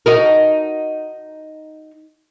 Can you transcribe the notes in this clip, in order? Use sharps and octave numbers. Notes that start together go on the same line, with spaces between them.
D#4 F#4 A#4